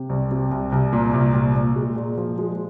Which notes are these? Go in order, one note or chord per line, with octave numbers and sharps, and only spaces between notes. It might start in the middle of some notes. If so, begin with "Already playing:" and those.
Already playing: C3
C2
C3
C2
C2
A#2
C2
A#2
A#2
G#3
A#2
F3
G#3